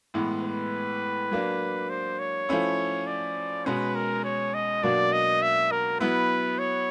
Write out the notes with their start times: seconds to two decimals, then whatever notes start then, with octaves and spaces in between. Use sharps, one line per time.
0.14 A2 E3 G#3 B3
0.43 B4
1.31 F#3 A#3 D4
1.90 C5
2.19 C#5
2.49 F3 A3 C#4 E4
3.07 D5
3.66 B2 G#3 C#4 B4
3.96 A#4
4.25 C#5
4.54 D#5
4.83 B2 F#3 A#3 D4 D5
5.13 D#5
5.42 E5
5.71 A#4
6.00 F#3 B3 E4 B4
6.59 C#5